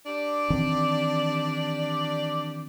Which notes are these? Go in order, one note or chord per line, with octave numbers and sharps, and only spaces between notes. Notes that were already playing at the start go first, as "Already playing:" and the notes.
D4 G4 D5
D#3 E3 C4